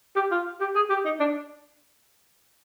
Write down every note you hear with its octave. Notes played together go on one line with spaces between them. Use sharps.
G4
F4
G4
G#4
G4
D#4
D4